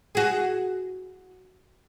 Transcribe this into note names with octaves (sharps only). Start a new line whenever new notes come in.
F#4 G#4